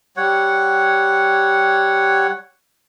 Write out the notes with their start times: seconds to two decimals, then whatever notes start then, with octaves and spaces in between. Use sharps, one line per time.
0.17 G3 C#5 F#5